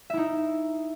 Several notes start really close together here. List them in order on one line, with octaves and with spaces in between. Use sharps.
E5 E4 D#4